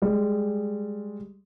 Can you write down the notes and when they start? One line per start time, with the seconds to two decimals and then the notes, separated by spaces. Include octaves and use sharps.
0.02 G3 G#3